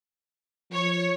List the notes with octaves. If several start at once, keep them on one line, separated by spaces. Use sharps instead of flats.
F3 C#5